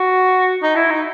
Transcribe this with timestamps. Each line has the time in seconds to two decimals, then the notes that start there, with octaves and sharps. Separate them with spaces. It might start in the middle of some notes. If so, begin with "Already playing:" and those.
Already playing: F#4
0.63 D#4
0.76 E4
0.90 D#4